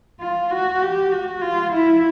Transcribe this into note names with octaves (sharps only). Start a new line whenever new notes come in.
F4
F#4
G4
F#4
F4
E4